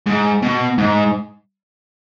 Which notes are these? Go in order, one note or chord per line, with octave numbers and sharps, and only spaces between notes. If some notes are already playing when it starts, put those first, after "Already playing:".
G#2
B2
G#2